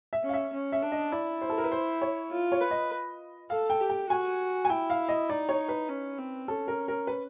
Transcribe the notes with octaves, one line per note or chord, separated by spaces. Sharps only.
E5
C#4
F5
E5
C#4
E5
D4
D#5
E4 D5
C5
A4
A#4
B4
C5
C#5
F4
C#5
B4
D#5
A4 F5
G5
G4
G5
F#4 G#5
G#5
E4 G5
F5
D#5
D#4 D5
C#5
B4
C#4
C4
C#4 A4
A#4
A#4
B4